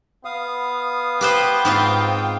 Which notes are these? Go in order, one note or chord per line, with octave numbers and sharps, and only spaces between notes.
B3 F5 D#6
G4 B4 C5 G5
G#2 C4 F4